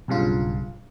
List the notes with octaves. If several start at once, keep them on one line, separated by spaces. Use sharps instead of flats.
B1 G2 C#3 F4